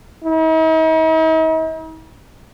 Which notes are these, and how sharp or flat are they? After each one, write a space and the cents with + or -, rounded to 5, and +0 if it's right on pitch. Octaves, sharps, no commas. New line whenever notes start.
D#4 +45